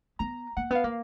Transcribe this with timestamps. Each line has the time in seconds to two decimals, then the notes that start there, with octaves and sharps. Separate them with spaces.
0.19 B3 A#5
0.57 A#3 F#5
0.71 B3 F5
0.84 A#3